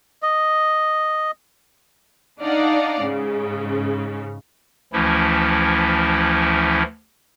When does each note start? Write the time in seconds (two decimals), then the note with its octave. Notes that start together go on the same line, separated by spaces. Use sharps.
0.22 D#5
2.41 D4 D#4 D5 F5 F#5
3.02 G#2 C#3
4.93 D2 E3 F3 A3 C#4 E4